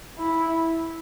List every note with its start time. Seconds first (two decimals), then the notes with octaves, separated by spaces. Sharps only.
0.18 E4